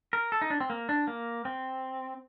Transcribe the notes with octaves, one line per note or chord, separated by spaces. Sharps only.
A#4
A4
D#4
D4
C4
A#3
D4
A#3
C4